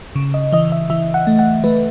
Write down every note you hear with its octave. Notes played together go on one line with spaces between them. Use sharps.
C#3
D#5
E3 D#5
E5
E3 E5
F#5
A3
F#5
A3 B4